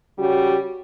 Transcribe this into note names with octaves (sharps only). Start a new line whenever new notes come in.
C#3 G3 F#4